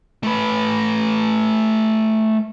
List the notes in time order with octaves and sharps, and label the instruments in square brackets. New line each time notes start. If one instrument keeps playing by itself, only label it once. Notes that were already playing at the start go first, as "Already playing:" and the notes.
[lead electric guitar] A3 B4